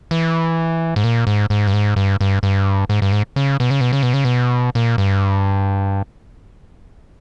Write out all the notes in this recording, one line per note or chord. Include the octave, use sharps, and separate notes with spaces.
E3
G#2
A#2
G#2
G#2
G2
G#2
G2
G2
G2
G#2
G2
G#2
C#3
B2
C#3
B2
C#3
B2
C#3
B2
A#2
G2